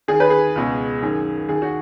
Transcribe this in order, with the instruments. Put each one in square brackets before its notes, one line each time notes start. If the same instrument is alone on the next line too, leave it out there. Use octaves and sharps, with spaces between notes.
[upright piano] D#2 D#3 G#4
B4
G#4
C#2 B2
F#2 D#3
D#2 D#3 G#4
F#4